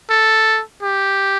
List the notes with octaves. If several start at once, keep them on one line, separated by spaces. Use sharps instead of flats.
A4
G4